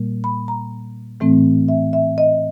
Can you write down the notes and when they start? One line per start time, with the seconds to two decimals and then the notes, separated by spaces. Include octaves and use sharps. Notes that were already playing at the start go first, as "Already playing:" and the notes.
Already playing: A#2 G3 A#3
0.24 B5
0.48 A#5
1.20 A2 E3 A3 C4
1.68 E5
1.93 E5
2.18 D#5